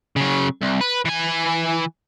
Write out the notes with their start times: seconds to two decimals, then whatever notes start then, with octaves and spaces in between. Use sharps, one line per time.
0.16 C#3 F#3
0.61 C2
0.81 B4
1.05 E3 G#5